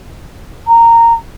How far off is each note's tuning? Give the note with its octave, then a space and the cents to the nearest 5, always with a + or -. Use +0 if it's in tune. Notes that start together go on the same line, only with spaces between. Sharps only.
A#5 -15